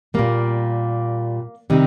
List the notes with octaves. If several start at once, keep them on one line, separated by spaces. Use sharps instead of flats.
A#2 G3 A#3
C3 D#3 G3 D#4